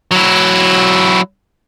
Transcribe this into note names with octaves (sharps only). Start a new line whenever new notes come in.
F#3 E4